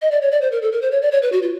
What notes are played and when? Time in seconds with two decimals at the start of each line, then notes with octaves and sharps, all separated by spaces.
0.02 D#5
0.11 D5
0.22 C#5
0.32 D5
0.42 C5
0.52 A#4
0.62 A4
0.72 A#4
0.82 C5
0.92 C#5
1.02 D5
1.12 C#5
1.22 B4
1.32 F#4
1.42 F4